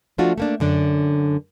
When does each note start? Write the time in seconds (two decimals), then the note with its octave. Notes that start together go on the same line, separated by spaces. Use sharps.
0.18 F3 A3 D4 F4 F#4
0.38 A3 A#3 D4
0.60 F#2 D3 D4